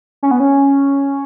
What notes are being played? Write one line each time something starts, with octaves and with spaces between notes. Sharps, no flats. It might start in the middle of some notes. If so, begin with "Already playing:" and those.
C#4
B3
C#4